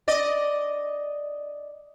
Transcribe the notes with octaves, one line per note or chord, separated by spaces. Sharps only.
D5 D#5